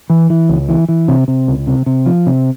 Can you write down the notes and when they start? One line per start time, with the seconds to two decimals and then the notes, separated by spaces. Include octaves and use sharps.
0.10 E3
0.30 E3
0.49 C#2
0.69 E3
0.89 E3
1.08 C3
1.28 C3
1.48 C#2
1.67 C3
1.86 C3
2.06 F3
2.27 C3